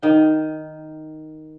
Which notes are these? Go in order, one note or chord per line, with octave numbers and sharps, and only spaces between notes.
D#3 G5